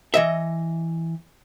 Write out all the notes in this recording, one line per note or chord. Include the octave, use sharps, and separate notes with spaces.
E3 D#5 E5